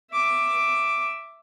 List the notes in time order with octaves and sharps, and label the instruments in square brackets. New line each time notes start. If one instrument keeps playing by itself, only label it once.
[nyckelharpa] E5 D6